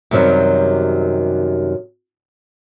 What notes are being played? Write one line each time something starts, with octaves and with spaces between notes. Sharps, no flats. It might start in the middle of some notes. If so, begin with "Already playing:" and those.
F#2 C3 D#3 F#3 G3